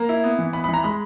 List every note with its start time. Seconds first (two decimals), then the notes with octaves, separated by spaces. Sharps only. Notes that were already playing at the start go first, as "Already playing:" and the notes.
Already playing: A#3 A#5
0.09 E4
0.23 B3
0.39 E3
0.53 B3 B5
0.64 B5
0.69 E3
0.74 A#5
0.84 G#3 B5